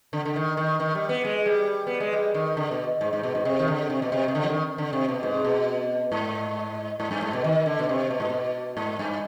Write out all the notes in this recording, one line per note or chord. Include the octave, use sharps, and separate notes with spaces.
D3
D3
D#3
D#3
D#3
G3
B3
G#3
G3
B3
G#3
G3
D#3
D3
B2
G#2
G#2
B2
G#2
C3
D#3
D3
C3
B2
C3
C3
D3
F3
D#3
D3
C3
B2
G#2
C3
B2
G#2
G#2
G2
G#2
B2
D#3
D3
B2
C3
B2
G#2
B2
G#2
G2